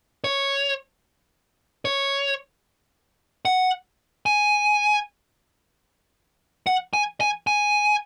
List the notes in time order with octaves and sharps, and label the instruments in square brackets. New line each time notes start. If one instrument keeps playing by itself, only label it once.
[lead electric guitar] C#5
C#5
F#5
G#5
F#5
G#5
G#5
G#5